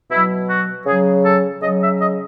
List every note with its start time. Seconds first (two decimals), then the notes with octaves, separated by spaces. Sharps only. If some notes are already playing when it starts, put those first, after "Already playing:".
0.10 B2 F#3 E4
0.48 F#4
0.85 C#3 F#3 G#4
1.24 A4
1.61 C#3 F#3 D#5
1.80 E5
1.99 D#5